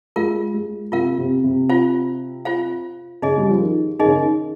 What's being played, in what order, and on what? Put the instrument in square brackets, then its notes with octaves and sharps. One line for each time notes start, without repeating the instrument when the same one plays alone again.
[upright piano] G#3 [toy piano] F4 A#4 F5
[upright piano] G#3
[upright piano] C3 [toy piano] F4 A#4 F5
[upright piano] C3
C3
[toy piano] F4 C5 F5
F4 C5 F5
[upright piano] C#3 [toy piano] D#4 G#4 D#5
[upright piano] G3
F3
D#3
[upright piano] D#3 [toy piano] D#4 G#4 D#5
[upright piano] C#3
D#3